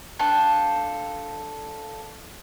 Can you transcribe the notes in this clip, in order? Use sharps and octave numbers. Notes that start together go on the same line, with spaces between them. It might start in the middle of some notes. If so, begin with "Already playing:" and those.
D4 F4 A4 G5